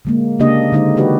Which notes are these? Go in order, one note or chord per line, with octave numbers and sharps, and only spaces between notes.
D3 G#3 A#3
C#3 A#3 D4 G4 D#5
D3 G#3 D#4 C5 D#5
E3 D#4 F#4 G4 B4 D5